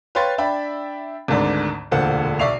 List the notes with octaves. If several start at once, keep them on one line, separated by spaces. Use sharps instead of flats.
B4 C#5 F5 G5 C6 A6
D4 E5 G5 B5
G#1 D2 G#2 D3 D5
E1 D2 A#2 A4 C5 F#5
B1 D5 E5 C#6 C7 F7